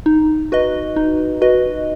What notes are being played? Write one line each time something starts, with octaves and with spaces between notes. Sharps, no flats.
D#4
F#4 B4 D#5
D#4
F#4 B4 D#5